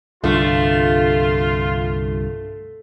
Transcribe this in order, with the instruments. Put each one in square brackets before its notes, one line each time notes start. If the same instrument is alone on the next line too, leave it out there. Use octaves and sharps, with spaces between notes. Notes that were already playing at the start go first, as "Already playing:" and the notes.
[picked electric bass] C2 G2 D3 [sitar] A3 [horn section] F4